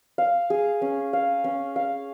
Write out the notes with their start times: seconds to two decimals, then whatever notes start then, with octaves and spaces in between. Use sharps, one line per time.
0.18 F5
0.50 G#4
0.82 C#4
1.13 F5
1.44 C#4
1.76 F5